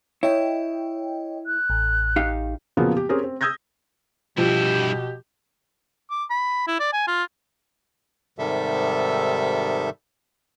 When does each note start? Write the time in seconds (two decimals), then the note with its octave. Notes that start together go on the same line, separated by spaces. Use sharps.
0.23 E4 C#5 D#5 G5
1.47 F#6
1.70 A1
2.16 D#4 G4 F5
2.77 A#2 C#3 F3 F#3 A#3 B3
2.97 G4
3.09 C4 C#4 G4 G#4 A#4
3.24 C4
3.41 D#6 E6 G6 G#6 A#6
4.38 G2 B2 F3 E4 G4
6.11 D6
6.30 B5
6.68 E4
6.80 D5
6.93 G#5
7.08 F4
8.39 G#2 C3 D#3 G3 A4 E5